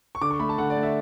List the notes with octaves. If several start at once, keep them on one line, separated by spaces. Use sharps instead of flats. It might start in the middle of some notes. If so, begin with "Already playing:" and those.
C#6
D3 D6
C#6
A3 B5
A5
D3 F#5
D5
A3
E5